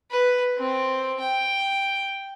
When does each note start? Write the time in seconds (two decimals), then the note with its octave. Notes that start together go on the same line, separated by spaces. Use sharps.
0.11 B4
0.58 C4
1.20 G5